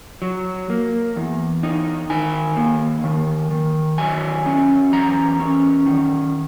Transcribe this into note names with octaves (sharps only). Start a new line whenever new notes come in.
F#3
A#3
E2
D#4
D#3 G#5
A#3
D#3
D#3
F#3 G#5
C#4
E2 A#5
C#4
D#3